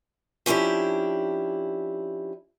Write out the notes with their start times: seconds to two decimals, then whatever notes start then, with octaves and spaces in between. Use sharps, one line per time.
0.46 F3 C#4 D4 E4 G4